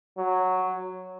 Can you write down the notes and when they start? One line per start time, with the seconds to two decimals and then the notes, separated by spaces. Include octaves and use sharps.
0.17 F#3